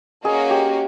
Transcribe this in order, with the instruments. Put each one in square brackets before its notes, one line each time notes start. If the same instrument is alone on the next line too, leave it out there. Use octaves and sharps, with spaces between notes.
[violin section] A#3 C#4 F#4 A#4 D#5 [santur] G#4
[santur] G4